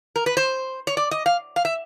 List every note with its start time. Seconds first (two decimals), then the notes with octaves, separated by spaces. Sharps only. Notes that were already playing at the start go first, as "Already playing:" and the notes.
0.16 A#4
0.26 B4
0.37 C5
0.87 C#5
0.97 D5
1.11 D#5
1.26 F5
1.56 F5
1.65 E5